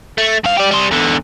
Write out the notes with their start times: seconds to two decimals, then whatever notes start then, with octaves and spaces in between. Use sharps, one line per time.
0.18 A3
0.44 G2 F5
0.58 G4 D5
0.71 G3 C5
0.91 E2 D3